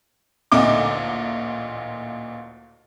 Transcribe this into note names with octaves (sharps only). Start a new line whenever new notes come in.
A1 D2 A#2 A3 D#4 D6